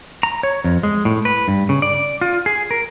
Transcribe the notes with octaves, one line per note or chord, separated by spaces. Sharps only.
A#5
C#5
F2
G#3
A2
B4
G2
C#3
D5
F4
G#4
A#4